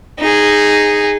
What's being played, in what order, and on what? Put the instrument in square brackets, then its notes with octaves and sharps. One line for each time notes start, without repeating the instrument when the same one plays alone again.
[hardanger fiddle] D#4 G#4